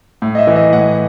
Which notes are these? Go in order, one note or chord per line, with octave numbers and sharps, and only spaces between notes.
A2
D#5
E5
E3
D#5
A2 F#5